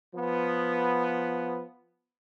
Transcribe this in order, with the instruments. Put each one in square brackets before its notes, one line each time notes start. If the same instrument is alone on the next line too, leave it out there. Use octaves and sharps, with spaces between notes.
[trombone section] F3 B3